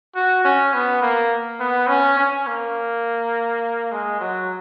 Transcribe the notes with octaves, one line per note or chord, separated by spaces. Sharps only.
F#4
C#4
B3
A#3
B3
C#4
C#4
A#3
G#3
F#3